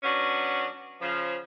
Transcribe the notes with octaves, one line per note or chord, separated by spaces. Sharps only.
F#3 B3 C#4 D4 F#4
C#3 F3